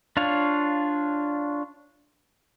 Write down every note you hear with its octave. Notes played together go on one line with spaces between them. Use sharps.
D4 F4 C#5 F5